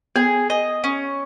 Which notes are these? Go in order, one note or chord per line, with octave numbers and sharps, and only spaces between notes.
B3 G#4
D#5
C#4